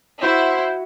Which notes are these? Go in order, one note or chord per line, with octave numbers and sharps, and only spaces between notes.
E4 F#4 C5